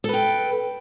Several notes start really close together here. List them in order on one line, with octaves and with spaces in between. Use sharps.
A4 B4 G5